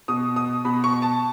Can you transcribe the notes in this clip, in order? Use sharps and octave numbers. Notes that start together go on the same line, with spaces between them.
B2 D#6
D#6
B2 B5
C#6
A5